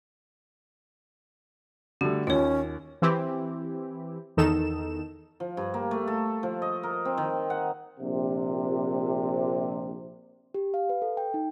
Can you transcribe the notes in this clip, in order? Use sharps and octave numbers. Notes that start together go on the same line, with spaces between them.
D3 G3 A3 F#4
D#2 C#4 F4 C#5
E3 C4 E4 G4
E2 D#3 D#4 A4 E7
F3
G2
A#3
A3
A4
F3
D#5
A#4
C4
D#3
F#5
A#1 C3
G4
F5
B4
A4
G5
D#4